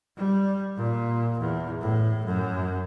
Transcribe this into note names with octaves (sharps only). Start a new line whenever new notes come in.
G3
A#2
E2
A2
F#2